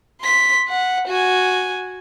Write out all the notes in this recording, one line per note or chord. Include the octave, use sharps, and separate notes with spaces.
C6 B6
F#5
F#4 G#5